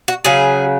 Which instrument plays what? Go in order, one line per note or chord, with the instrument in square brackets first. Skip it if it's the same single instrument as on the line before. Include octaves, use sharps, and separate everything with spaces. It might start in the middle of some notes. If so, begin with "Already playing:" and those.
[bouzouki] F#4
C#3 F#3 G#4